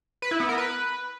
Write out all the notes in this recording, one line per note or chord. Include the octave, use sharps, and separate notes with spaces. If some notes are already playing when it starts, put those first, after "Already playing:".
B4
E4
B3
A#4
B4